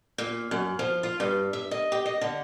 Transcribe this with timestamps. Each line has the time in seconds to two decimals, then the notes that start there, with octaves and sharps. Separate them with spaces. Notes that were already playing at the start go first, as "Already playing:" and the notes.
0.18 A#2
0.51 F#2
0.79 F3
1.03 F4
1.20 G2
1.53 E5
1.71 D#5
1.92 G4
2.06 D#5
2.21 D3